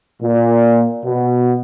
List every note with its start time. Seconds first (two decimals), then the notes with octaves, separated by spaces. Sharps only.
0.22 A#2
1.04 B2